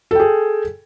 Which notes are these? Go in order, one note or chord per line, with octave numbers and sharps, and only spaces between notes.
G#4 A4 G5